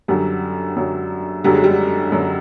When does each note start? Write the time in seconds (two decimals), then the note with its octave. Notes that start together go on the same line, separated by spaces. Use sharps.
0.08 F#2 D3 F#3 G3
0.76 F#2 D3 F#3
1.44 F#2 D3 F#3 G3
1.54 G#3
1.64 G3
2.12 F#2 D3 F#3